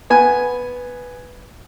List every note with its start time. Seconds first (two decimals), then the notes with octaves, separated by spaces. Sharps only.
0.10 B3 G#5